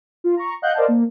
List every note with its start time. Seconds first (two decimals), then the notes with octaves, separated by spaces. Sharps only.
0.24 F4
0.37 A#5 C#6
0.62 D#5 F5 F#5 F#6 G6
0.75 A#4 C5 D5 D#5 F5 A5
0.88 A#3